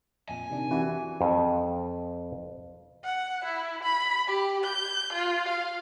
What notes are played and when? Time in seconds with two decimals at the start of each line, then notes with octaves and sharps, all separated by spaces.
0.29 F2 A#2 G#5
0.50 C3 D#3 D4
0.71 E3 F#4 G4 B4
1.21 F2
3.04 F#5
3.44 E4
3.83 B5
4.27 G4
4.64 G6
5.13 F4
5.48 F5